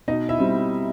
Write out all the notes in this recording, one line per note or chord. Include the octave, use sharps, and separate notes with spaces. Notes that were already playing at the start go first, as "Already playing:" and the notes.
B2 D#4 D#5
E4 E5
G3 C4